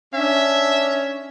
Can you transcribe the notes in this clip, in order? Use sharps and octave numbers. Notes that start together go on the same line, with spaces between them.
C#4 D4 E5